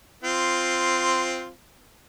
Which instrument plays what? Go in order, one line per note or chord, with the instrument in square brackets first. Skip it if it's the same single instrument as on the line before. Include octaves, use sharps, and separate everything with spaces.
[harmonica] C4 F4